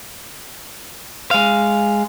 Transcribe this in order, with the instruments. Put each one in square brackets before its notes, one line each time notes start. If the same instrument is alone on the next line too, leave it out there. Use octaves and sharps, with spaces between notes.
[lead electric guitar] G#3 F5